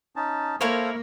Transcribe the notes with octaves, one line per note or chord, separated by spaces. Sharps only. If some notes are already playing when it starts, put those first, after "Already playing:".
C#4 D#4 A5
A#3 E4 A4 A#4 C5 C#5 F5